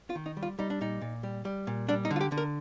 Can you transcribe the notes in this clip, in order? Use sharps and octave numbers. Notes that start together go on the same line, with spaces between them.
F4
D#3
D#4
G3
F4
G3 D#4
D4
A#2 D#4
A#2
G3
G3
A#2
G3 D4
D#4
D3
F4
G4
D3
A#4